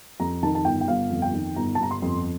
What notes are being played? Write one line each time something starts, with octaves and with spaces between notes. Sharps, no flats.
F2 A#5
D#3 A5
A5
G1 G5
G5
G1 F5
F2
G5
D#3
G1 A#5
A5
G1 A#5
C6
F2